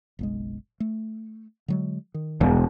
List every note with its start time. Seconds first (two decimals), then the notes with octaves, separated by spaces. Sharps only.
0.19 F#1 B1 G#3
0.80 A3
1.68 D3 F#3 G#3
2.14 D#3
2.41 E1 C2 F2 G#2